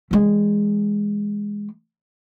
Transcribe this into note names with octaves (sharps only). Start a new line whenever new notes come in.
E3 G#3